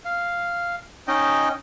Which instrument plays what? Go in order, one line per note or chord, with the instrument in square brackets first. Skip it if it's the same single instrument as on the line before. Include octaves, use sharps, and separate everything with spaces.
[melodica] F5
C#4 D#4 D#5 G5